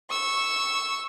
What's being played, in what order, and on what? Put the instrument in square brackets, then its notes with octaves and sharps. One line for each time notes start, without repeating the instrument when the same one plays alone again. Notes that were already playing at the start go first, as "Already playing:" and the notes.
[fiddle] C#6 E6